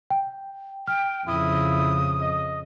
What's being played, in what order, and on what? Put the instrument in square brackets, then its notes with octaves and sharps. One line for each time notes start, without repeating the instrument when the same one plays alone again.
[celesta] G5
[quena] G5 [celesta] F6
[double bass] F2 C#3 [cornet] E4 [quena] D#6
[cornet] D#5